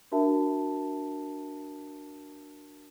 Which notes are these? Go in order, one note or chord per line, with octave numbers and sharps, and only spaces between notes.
D4 F#4 A#4 E5 A5